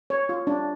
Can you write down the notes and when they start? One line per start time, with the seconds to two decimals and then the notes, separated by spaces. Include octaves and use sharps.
0.10 C#5
0.29 F4
0.47 D4